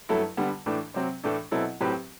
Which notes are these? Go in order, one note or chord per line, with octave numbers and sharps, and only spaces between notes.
G2 F#3 A3 E4 A4
D3 G3 B3
A2 E3 A3 D4
C3 F#3 C4
A2 E3 A3 D4 A4
B2 F#3 C4 E4 A4
A2 F#3 C4 G4 B4